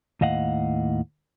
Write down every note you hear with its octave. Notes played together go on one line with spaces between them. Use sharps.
D#2 A2 D#5 F5 F#5